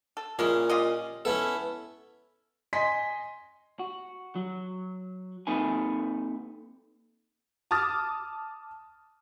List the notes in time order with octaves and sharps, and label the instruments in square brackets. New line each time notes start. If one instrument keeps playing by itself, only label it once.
[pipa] A4
[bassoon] A#2 [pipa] G#3 E4 G#4 [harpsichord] C#4
[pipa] F4 G4 D#5
[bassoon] B3 [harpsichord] C#4 E4 A4
[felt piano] D#5 G#5 C6 B6
[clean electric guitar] F#4
F#3
A#3 C4 D#4 A4 B4 G#5
[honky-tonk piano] A5 D6 D#6 F6 A6